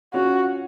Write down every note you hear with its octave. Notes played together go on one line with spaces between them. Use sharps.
C#4 F4 F#4